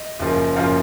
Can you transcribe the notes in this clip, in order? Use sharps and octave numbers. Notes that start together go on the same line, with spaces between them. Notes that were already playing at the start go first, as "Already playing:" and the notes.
Already playing: D#5
F#1 F#2 F3 A#3
F#2 F3 A#3 F5